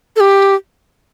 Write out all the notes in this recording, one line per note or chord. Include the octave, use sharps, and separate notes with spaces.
A4
G4